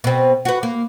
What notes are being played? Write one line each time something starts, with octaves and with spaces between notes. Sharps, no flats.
B2 C4
F#4 B4
A#3